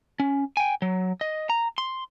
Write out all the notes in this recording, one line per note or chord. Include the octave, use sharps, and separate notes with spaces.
C#4
G5 G#5
F#3
D#5
A#5
C6